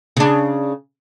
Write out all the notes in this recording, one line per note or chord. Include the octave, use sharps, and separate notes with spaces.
C#3 D4